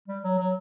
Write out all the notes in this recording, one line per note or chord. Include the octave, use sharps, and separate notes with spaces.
G3
F#3
F#3